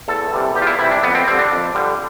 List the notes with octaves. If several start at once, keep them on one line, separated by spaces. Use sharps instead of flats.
E2 A4
C3 E3 G3
E2 G4
F4
E4
C3 E3 G3 E4
D4
F2 B3
C4
D3 G3 C4
D4
F2
D3 G3